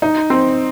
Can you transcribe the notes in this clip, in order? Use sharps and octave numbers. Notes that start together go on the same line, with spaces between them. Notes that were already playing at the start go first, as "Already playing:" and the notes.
D#4
C4